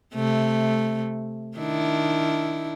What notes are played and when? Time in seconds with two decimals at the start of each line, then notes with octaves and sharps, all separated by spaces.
0.14 C3 A3
1.57 D#3 D4 E4